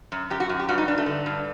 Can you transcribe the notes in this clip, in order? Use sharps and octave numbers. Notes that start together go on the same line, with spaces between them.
F#2
F#2 G4
F#4
F#2
G4
G2 F#4
D#4
G2 D4
A3
D3
G2